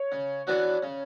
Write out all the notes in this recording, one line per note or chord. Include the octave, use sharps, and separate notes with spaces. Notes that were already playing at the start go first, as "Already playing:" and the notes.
Already playing: C#5
C#3
E3 B3 D4 F#4
C#3